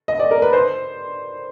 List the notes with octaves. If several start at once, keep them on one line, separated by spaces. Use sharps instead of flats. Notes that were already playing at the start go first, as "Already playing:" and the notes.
D#5
D5
A#4
B4
C5